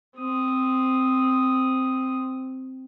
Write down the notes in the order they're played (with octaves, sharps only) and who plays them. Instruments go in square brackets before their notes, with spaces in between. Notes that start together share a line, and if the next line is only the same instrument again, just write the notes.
[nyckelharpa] C4 D#6